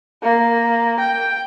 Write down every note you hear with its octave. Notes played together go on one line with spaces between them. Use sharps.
A#3
G5